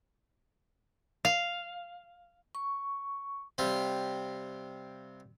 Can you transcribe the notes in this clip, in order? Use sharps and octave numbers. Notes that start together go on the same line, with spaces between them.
F5
C#6
C3 G3 C4 F4